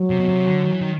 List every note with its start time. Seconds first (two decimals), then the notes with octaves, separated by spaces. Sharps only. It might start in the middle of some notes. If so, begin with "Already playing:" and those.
Already playing: F#3
0.10 C3
0.19 B2
0.29 C3
0.46 D3
0.64 D#3
0.72 E3
0.81 D#3